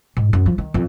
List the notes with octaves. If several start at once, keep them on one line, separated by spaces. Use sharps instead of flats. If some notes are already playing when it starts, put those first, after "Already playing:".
G#2
F#2
F3
D#3
F2